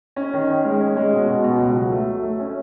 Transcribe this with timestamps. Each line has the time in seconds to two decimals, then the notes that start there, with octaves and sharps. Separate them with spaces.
0.16 C#4
0.33 D#3
0.49 C#4
0.65 G#3
0.81 C#4
0.96 G#3
1.12 B2
1.29 B2
1.44 B2
1.60 C#2
1.76 F#3
1.92 A3
2.08 F#3
2.23 A3
2.40 C#4